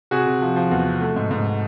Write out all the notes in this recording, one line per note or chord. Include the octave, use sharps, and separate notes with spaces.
C3 F#4 G#4
C3
F3
F3
E2
C3
A3
G#2
G#2